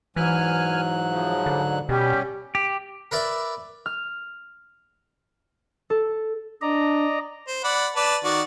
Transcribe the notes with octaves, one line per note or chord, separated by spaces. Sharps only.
G#2 E3 F#3 G#5 F6 F#6
C#3 F3
D3
B2 G3 C#4 G4
G4
A#4 B4 D5 E5
F6
A4
D4 D5 D#5 A#5
C5
D5 F#5 B5
B4 D5 A5
D#3 F#4 D5